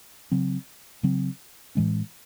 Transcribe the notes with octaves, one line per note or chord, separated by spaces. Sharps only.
C#3 F#3 C4
C#3 F#3 C4
A2 E3 G#3 C#4